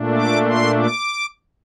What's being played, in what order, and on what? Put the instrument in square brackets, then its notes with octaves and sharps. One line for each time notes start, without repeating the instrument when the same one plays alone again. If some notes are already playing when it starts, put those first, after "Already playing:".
Already playing: [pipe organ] A#2 A3 D4
D6
C6
D6